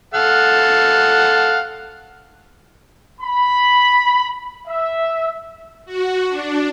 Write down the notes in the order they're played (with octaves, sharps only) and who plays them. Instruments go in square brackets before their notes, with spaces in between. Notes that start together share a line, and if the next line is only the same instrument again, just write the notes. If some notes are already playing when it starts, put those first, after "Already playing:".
[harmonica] A4 F5 F#5
[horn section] B5
E5
[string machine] F#4
D4